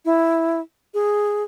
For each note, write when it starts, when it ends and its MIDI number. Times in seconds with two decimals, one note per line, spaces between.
0.05 0.60 64
0.94 1.43 68